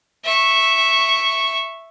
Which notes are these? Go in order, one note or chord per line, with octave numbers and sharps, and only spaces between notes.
E5 C#6